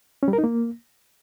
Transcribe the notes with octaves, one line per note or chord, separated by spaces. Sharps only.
C#4
G3
A#4
D#4
A#3